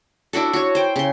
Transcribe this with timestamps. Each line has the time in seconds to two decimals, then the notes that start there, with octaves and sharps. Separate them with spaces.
0.33 D4 E4 F#4 A4
0.53 F#4 C#5
0.75 C5 G5
0.96 C#3 C6